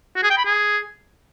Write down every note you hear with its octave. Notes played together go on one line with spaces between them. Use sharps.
F#4
G#4
G5
B5
G#4